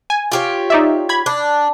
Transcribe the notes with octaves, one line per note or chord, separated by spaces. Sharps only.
G#5
F4 G4 C#5
D#4 D5 E5
B5 G#6
D4